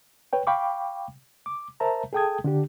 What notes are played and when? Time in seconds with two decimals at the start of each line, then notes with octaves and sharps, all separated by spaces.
0.33 B4 C#5 G5
0.47 F5 G5 B5 C#6 D6
1.46 D6
1.80 A#4 C5 E5 A5 A#5
2.13 G#4 A4 G5 A5 D#6 G#6
2.44 D3 D4 G4